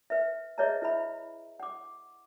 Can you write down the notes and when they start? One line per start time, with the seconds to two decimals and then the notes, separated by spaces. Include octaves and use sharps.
0.10 B4 E5
0.58 G#4 B4 C#5 D#5 E5 A#5
0.82 E4 B4 E5 B5
1.60 F#5 D6